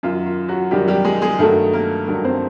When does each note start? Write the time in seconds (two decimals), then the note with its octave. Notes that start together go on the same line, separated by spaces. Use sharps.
0.03 F#2 D#3 F#3 F4
0.26 F4
0.48 F#3 F#4
0.71 F#2 D#3 F#3 G3 G4
0.88 G3 G4
1.05 G#3 G#4
1.22 G#3 G#4
1.39 G2 D#3 F#3 A3 A4
1.73 A#3 A#4
2.07 G2 D#3 F#3 A#3 A#4
2.24 C4 C5